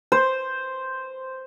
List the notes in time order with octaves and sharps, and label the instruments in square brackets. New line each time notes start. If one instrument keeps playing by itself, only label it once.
[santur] C5